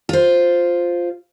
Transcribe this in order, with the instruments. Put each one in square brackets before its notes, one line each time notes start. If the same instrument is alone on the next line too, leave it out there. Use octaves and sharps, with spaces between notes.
[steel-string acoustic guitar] F4 C5